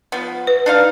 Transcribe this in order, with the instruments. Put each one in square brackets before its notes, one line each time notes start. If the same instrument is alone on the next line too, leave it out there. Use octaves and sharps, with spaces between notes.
[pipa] F3 B3
[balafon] B4
[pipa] D4 D#4 F5